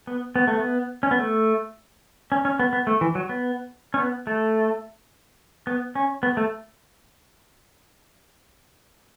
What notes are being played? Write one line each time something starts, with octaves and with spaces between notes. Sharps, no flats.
B3
B3
A3
B3
C#4
B3
A3
C#4
C#4
B3
B3
A3
E3
F#3
B3
C#4
B3
A3
B3
C#4
B3
A3